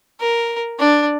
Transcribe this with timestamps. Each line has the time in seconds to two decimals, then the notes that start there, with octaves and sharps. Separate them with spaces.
0.21 A#4
0.79 D4